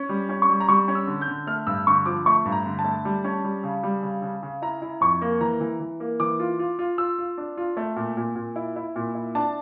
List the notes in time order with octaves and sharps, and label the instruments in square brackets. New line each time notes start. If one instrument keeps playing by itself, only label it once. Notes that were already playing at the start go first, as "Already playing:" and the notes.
Already playing: [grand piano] C#4
G3
C#4
C#6
G3
A#5
G3 C#6
C#4
E6
D3
G6
D3
A3 F6
G2 E6
D3 C#6
F3 D6
A3 C#6
G2
A#5
D3
A5
A3
G3
C#4
G3
C#3
G3
C#3
C#3
C#3
E4 A#5
E4
F2 C#6
A#3
E3 A#5
E3
E3
A#3
E3 D6
F4
F4
F4
F4 E6
F4
D4
F4
A3
A#2
A#2
A#2
E4
E4
A#2
E4
D4 A5